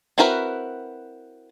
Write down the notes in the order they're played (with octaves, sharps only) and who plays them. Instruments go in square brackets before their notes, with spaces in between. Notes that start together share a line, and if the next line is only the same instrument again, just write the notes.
[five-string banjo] C4 E4 F#4 A#4 B4